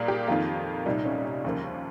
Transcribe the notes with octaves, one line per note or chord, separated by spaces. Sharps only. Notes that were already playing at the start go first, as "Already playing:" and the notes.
Already playing: A#2 G3 A#3 G#4 A#4
G4
F2 D#3 A#3 F4
C2 A#2 G3 D#4
C#4
C#4
D#2 C#3 F3 A#3